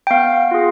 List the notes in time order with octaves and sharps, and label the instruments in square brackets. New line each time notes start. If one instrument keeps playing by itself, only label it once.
[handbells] G5
B3 F5
F4 G#4